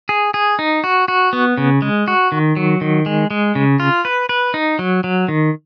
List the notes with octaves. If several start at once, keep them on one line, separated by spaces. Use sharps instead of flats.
G#4
G#4
D#4
F#4
F#4
B3
C#3
G#3
F#4
D#3
F#3
D#3
G#3
G#3
C#3
F4
B4
B4
D#4
F#3
F#3
D#3